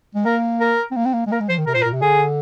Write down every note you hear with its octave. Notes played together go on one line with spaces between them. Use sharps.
G#3
A#3 A#4
A#4
C4
A#3
C4
A#3
G#3
A#3 A#4
G#3
F3 C5
D#3
C3 A#4
A#2 C5
A#4
A#2
C3
D3 G#4